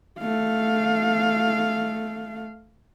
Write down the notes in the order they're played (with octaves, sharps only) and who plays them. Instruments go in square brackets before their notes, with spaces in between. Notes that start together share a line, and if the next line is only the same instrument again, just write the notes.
[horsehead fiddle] A3 F5